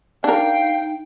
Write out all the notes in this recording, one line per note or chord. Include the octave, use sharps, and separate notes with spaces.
D4 D#4 A#4 F5 G5